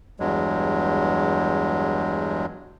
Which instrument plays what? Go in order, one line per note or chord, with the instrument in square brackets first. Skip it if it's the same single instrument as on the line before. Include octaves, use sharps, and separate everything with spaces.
[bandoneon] E2 G2 F#3 G#3